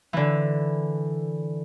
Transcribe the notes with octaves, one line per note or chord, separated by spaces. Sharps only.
D3 E3